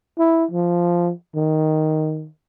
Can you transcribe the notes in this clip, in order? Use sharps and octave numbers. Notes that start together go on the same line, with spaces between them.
E4
F3
D#3